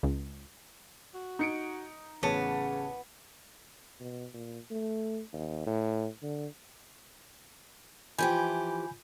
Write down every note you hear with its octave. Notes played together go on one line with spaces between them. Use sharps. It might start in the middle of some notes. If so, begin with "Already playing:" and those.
C#2
F#4
D#4 C#7 D7
A1 C#3 B3 C#5 A5
B2
A#2
A3
D#2
A2
D3
E3 F3 G4 G#5 B5 G6